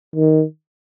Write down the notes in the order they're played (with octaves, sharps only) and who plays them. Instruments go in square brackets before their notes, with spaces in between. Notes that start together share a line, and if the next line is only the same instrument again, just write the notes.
[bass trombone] D#3